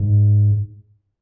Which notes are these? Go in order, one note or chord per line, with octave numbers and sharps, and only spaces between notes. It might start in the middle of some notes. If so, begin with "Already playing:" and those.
Already playing: G#2